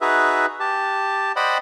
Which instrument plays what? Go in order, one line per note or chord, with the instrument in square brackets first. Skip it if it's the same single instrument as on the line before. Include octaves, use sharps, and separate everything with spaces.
[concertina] D#4 F#4 G#4 B4 E5
G4 A5
C5 D5 D#5 F#5 G5 B5